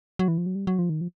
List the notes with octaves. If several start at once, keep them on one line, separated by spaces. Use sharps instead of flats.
F#3
E3
F3
F#3
G3
F#3
F3
D#3
F3